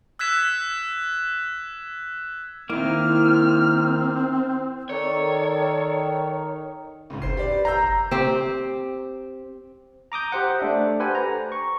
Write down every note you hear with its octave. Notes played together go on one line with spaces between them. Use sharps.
E6 F#6 G#6 B6 E7
D#3 A#3 C4 E4 F6
D#3 A4 C#5 D5 A#5
C#2 G#2
F#1 C5 C7
G4 B4 D5
A#5 E6 G6 C7
C4 G4
A#5 D6 D#6 G6
G4 C5 F#5
A3 D4 E5
G4 A4 B4 C5 F#5 G#5
A#5
C#6